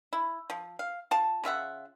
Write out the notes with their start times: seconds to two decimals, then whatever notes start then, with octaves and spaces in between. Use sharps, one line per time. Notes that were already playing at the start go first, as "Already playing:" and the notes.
0.13 E4
0.50 F3
0.79 F5
1.11 F4 A5
1.44 C#3 F4 E5 F#5